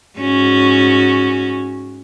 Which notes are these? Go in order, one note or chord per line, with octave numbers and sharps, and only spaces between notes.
G#2 C#4 F#4